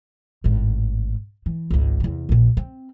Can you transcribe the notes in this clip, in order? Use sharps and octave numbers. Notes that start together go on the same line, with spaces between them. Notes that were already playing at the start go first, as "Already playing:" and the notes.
G#1 A2
E3
G#1 C#2
E2 C3
A#1 A#2
C4